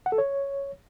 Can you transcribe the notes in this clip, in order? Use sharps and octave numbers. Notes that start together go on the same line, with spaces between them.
F#5
A4
C#5